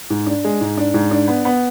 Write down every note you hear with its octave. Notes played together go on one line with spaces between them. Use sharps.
G#2
D4
G#3
G#2
D4
G#2
D4
B3
B3